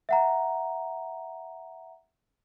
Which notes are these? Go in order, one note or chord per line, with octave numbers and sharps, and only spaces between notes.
E5 F#5 A#5